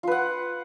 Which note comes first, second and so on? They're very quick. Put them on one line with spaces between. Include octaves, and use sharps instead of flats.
F4 B4 F#5